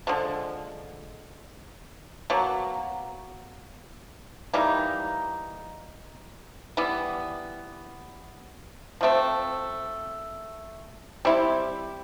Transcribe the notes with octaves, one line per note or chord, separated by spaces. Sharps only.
D3 F3 G#3
B2 F#3 A#3
E3 G3 A#3 D#4
E3 G3 B3
F3 A3 C4
G3 C4 E4 G4